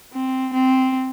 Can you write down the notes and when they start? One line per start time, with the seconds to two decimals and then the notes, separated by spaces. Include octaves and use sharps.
0.13 C4
0.54 C4